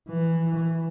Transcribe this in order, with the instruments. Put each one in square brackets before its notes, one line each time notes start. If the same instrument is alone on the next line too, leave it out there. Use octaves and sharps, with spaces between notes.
[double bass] E3